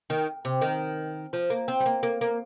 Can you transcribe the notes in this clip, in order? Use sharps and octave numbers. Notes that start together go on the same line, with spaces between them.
D#3
C3
D#3
F3
A#3
C4
G3
A#3
A#3
A#3